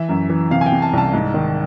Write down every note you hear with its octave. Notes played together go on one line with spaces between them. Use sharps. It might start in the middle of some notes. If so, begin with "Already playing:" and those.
Already playing: E3 E5
F#2
E3
C3 F5
G#5
G5
C3
A5
C2 A5
G#2
D#3